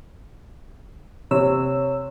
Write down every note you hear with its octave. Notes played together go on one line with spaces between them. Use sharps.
C3 C#5 E6